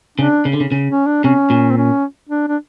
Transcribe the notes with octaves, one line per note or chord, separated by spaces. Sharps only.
C#3 D4
C#3
D3
C#3
C#3
C#4
D4
C3 C#4
A#2
C4
C#4
D4
D4